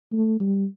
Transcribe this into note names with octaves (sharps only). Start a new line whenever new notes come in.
A3
G3